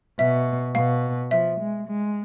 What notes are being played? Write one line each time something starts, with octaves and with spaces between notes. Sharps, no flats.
B2 E5
B2 F5
F3 E5
G#3
G#3